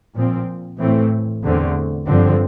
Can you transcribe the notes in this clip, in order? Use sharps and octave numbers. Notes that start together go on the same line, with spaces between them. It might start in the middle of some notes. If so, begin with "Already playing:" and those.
A#2 F3 C4
A2 E3 A3 C4
E2 D3 A3 C4
G2 D3 F3 C4